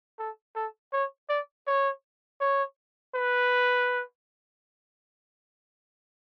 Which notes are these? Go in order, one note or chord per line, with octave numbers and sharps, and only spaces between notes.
A4
A4
C#5
D5
C#5
C#5
B4